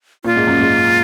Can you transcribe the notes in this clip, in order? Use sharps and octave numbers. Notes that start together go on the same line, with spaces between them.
A#2 F4
G#2
F#2
G#2